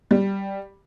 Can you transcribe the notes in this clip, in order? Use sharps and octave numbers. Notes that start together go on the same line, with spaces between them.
G3